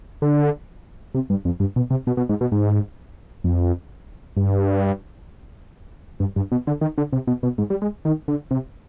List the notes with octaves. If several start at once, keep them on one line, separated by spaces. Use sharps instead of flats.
D3
C3
G2
F2
G2
B2
C3
B2
B2
G#2
B2
G#2
F2
G2
G2
G2
B2
D3
D#3
D3
C3
B2
B2
G#2
G3
G#3
D#3
D3
C3